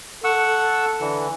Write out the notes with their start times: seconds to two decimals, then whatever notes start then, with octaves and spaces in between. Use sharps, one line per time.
0.24 A4 F#5 C#6 E6
1.00 D3 E3